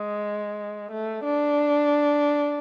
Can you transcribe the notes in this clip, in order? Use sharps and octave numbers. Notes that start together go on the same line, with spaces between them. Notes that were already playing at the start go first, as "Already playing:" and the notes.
Already playing: G#3
A3
D4